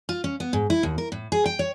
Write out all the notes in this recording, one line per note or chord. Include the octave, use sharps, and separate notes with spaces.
F4
C#4
B3
G#2
E4
D#2
A#4
A2
G#4
G5
C#5